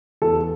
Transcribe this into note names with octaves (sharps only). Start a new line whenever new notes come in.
E2 A4